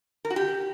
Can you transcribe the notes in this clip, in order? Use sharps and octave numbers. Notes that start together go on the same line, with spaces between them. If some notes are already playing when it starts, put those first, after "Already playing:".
A#4
F#4
G4